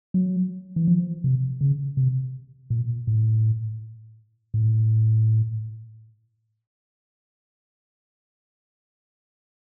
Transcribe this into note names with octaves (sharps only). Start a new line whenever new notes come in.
F#3
E3
F3
C3
C#3
C3
A#2
A2
A2